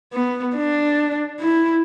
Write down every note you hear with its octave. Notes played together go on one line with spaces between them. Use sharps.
B3
D4
E4